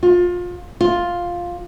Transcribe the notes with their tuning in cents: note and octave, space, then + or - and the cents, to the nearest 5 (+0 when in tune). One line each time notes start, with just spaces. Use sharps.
F4 +25
F4 +5